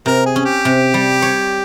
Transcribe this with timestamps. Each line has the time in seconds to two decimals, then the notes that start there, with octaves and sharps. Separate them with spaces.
0.06 C3 A#4
0.26 G#4
0.36 C#4
0.45 G4
0.65 C3
0.94 G3
1.22 C#5